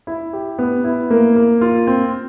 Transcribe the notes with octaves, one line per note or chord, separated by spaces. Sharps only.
E4
G4
B3
E4
A#3
A#3
F4
C4